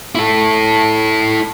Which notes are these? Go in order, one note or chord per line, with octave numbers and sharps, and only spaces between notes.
E4 A4